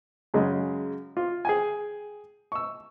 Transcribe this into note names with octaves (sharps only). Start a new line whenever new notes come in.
F#2 C#3 G#3
F4
G#4 G5 G#5
C#6 E6